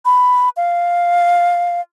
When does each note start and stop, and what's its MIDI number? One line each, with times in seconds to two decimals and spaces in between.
0.05 0.49 83
0.57 1.81 77